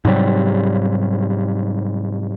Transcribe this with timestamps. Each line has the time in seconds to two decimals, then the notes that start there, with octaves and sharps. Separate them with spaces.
0.05 G#2 C3 F#3 G3